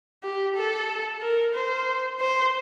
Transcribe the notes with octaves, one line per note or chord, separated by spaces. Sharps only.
G4
A4
A#4
C5
C5